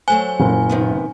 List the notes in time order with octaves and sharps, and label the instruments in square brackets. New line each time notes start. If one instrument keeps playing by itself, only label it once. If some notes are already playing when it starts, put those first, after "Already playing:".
[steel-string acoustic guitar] F#3 A3 C5 [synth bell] G#5
[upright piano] F#1 [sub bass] A#2
[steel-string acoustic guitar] C3 D#3 B3